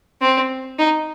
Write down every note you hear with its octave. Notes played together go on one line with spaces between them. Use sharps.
C4
D#4